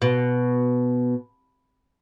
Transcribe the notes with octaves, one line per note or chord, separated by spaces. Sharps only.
B2